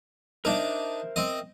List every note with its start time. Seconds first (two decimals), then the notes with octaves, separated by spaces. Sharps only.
0.45 D4 D#4 A#4 C5 E5
1.16 C4 D#5